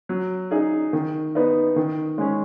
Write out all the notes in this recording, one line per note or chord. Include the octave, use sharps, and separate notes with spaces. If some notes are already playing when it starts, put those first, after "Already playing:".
F#3
D#4 G#4
D#3
B3 D#4
D#3
G#3 C#4